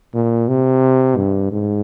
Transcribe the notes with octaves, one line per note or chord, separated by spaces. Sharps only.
A#2
C3
G2
G#2